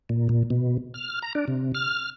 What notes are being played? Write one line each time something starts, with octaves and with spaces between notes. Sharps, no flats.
A#2
A#2
B2
F6
A#5
D4
C3
F6